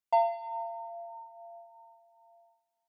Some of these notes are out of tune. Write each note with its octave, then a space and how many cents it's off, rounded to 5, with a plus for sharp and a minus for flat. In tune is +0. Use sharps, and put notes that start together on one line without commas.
F5 -35 A#5 -40